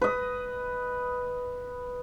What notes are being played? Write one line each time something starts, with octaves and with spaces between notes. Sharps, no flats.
B4 D#5